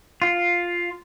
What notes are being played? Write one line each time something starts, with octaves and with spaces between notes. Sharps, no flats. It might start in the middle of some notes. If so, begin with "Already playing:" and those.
F4